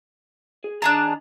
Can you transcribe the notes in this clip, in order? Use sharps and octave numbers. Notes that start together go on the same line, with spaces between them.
G#4
D#3 D4 G#4 A5 A#5